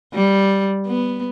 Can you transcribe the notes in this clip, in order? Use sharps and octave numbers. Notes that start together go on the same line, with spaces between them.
G3
B3